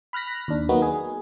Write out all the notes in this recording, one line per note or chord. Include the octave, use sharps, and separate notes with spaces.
B5 F6 F#6 A#6 B6
D#2 D4
F#3 A#3 B3 D#4 F#4
G#4